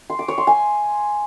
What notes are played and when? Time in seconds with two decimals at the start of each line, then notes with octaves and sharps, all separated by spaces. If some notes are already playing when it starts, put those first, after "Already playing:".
0.10 C6
0.19 D6
0.28 C#5
0.38 C6
0.47 G#5